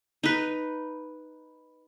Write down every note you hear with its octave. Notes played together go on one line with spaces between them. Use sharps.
D#4 B4